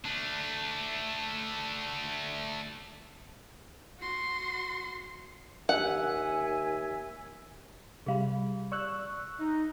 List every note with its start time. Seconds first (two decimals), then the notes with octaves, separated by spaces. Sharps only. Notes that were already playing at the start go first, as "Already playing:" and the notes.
0.05 A3 D4
3.99 F#4 C6
5.69 D#2 E5 F#5 G#5
8.06 C3 G3 G#4 F5 B5
8.72 D5 C#6 E6 F#6
9.39 D#4